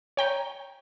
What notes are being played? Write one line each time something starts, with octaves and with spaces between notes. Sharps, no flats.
C#5 G5 A#5